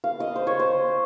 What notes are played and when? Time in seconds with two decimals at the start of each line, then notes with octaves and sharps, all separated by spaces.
0.04 F5
0.20 D#5
0.36 C5
0.47 C#5
0.59 C5